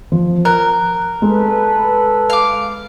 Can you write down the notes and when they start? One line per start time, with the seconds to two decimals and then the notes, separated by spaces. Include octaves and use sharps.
0.12 F3
0.45 A#4 F#6
1.22 G#3 A4 B4
2.30 F5 D6